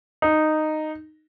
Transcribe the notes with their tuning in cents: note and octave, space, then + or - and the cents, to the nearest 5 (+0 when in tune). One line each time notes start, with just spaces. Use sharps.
D#4 -10